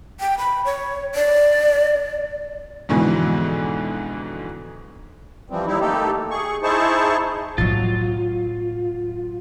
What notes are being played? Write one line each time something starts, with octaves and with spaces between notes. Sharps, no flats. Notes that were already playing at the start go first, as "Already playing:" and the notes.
G5
B5
C#5
D5
F2 G#2 B2 D3 E3
E3 F3 G3 C4
D#2 G3 D#4 E4
A3 A#3 D#4 G4 A4
G#4 C#6
D#4 E4 G#4 C5 A5 C#6
A2 F#3 B3 F4 A6